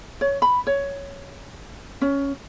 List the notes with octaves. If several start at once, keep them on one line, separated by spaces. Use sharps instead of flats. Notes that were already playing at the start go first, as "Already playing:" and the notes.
C#5
B5
C#5
C#4